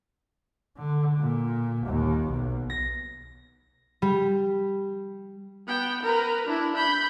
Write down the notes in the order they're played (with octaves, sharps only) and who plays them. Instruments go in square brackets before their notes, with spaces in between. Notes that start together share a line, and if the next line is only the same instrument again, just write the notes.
[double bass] D3
A#2
D#2
B1
[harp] A#6
G3
[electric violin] B3 G5
A#4 B4
D4 E4
B5 G6